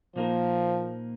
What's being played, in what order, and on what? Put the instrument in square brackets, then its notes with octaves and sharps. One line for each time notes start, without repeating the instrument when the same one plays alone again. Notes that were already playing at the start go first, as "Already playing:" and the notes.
[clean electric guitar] A#2 A#3 D#4 A#4 [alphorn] F3